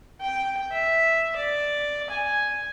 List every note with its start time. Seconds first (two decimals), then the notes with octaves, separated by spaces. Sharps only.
0.21 G5
0.71 E5
1.36 D5
2.10 G#5